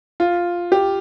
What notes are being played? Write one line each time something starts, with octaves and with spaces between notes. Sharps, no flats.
F4
G4